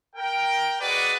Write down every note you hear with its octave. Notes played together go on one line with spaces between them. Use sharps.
A#4 G5
F#4 G#4 B4 D5 D#5